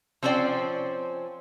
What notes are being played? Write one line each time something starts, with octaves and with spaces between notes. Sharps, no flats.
F3 C4 C#4 C5 D5 G5